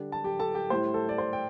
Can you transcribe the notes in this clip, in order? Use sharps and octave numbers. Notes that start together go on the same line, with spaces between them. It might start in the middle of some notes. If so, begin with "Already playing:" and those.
Already playing: D3 G3 D4
A5
G4 G5
A4 A5
G4 G5
A2 G3 E4 C5
A4
D5
C5
G5